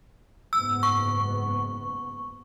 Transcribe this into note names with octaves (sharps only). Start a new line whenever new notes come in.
F#1 G#2 B3 E6
C#6